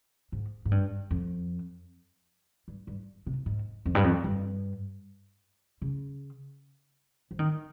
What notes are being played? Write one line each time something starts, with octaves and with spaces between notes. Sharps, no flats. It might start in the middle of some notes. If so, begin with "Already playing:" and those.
G#2
G#2
G2
F2
G2
G2
C3
G#2
F2
G2
F2
G2
C#3
F3
D#3